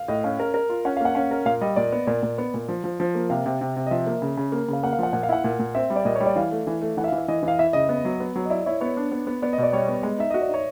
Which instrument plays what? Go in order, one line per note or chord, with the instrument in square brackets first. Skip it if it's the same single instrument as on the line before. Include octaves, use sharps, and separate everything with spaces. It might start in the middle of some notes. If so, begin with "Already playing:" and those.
Already playing: [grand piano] F5
[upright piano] A2 [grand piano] D#5
[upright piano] C#4 [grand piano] F5
[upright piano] A#4
A#4
F4
[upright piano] C#4 [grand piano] F#5
[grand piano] F5
[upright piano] A#3 [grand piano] F#5
[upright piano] C#4 [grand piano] F5
[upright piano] A#4
[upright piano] A#2 [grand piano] F5
[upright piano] G3 [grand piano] D#5
[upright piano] A#2 [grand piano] D5
[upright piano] B3
[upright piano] A#2 [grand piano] D5
[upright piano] A#2
B3
A#2
F3
F3
F3
A#3
[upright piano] C3 [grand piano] F5
[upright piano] C3
C3
C3
[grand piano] D#5
[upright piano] F3 [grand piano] E5
[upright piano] A#3
C#3
C#3
A#3
[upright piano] C#3 [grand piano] F5
[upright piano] A#3 [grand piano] F#5
[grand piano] F5
[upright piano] F3 [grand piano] F#5
[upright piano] A#2 [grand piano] F#5
[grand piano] F5
[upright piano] E4 [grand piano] F#5
[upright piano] A#2
A#2
[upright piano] C4 [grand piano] E5
[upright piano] G3
[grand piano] D5
[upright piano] A#2 [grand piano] D#5
[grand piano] C#5
[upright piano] G3
[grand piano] D5
[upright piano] E3 [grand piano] F5
[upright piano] A3
E3
A3
[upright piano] E3 [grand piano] F#5
[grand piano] E5
F5
[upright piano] E3
[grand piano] E5
[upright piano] E3 [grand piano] D#5
[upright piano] E3
[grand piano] F5
[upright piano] E4 [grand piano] E5
[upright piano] C#3 [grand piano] D#5
[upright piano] B3
F#3
B3
F#3
[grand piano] D#5
[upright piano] E4 [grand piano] D5
[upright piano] E4 [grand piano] C#5
[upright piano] B3 [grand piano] C#5
[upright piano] D4
B3
B3
[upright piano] B3 [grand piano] D5
[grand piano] D#5
[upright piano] B2 [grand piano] D5
[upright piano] G3 [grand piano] C#5
[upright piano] B3
G#3
[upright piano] D#4 [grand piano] E5
[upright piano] F#4 [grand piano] D#5
[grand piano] D5
[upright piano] D#4 [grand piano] C#5